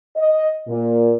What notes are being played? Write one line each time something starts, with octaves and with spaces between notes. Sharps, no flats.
D#5
A#2